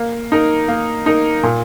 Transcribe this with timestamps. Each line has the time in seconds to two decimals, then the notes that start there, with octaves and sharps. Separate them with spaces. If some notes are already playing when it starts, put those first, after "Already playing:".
Already playing: A#3
0.32 D#4 A#4
0.68 A#3
1.06 D#4 A#4
1.43 A#2